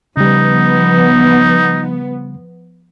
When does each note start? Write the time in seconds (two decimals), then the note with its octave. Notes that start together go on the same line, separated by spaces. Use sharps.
0.17 C#3 F3 G3 B3 D#4